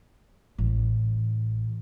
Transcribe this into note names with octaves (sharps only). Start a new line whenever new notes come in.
A1